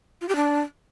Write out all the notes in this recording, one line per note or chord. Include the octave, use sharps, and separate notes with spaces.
F4
G4
D4